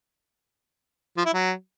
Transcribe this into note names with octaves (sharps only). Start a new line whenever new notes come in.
F3
E4
F#3